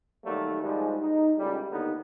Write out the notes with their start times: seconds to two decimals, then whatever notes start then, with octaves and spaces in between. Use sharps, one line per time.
0.24 D#3 F#3 G3 A3 A#3
0.62 G#2 F3 G3 G#3
1.01 D#4
1.37 C#2 A2 G3
1.70 D#2 A2 D3 B3 D#4